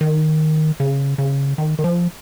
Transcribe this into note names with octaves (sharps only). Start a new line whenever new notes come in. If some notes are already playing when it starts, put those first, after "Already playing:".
D#3
C#3
C#3
D#3
D#3
F3